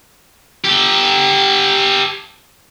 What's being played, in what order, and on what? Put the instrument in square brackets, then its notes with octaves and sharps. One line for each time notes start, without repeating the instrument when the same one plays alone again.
[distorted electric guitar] G4 A4